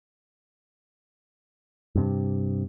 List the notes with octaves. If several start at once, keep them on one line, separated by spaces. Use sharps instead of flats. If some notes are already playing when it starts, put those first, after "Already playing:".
G2 C3